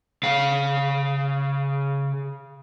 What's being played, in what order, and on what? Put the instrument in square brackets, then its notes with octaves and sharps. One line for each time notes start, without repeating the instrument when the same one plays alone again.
[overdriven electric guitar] C#3 F5